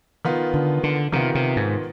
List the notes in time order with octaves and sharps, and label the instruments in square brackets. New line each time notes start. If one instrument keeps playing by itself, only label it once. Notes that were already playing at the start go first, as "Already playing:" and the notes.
[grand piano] D#3 B3 F4
[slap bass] D3
D3
[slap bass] C3 [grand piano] D#3 B3 F4
[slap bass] C3
G#2